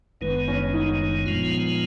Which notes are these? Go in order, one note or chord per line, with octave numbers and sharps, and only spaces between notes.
F#1 F#2 D#3 G#3 B3
C#4
D#4
A#2 F3 G#3 B3 F4